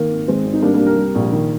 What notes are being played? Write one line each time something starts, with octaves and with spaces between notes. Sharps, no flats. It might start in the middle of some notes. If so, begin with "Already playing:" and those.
Already playing: D#3 A#3
G#1
D#3 G#3 C4
G#1
D#4
G3 A#3 D4
A#3 D4
C2
G4 A#4
G3
A#1
D#3